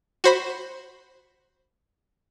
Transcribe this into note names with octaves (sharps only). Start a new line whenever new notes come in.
F#4 C5 B5